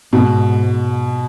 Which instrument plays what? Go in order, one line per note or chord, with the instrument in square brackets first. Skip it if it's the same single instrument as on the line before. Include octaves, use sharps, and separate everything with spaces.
[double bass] G#2 [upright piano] B2